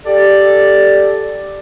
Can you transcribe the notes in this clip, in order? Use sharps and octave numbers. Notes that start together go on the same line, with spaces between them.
G4 A4 D5